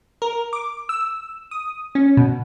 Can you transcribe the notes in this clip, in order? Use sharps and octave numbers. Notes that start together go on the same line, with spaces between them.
A#4
D6
E6
D#6
C#4
B2